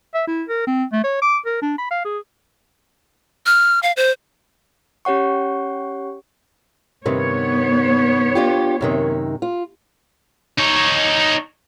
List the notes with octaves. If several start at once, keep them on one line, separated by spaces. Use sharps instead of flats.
E5
E4
A#4
C4
A3
C#5
D6
A#4
D4
B5
F5
G#4
F6
F5
C5
C#4 G4 C#5 F#5 C#6
G2 C3 D#3 B3 C#5
D4 F4 G4
F#2 C3 D#3
F4
D#4 C#5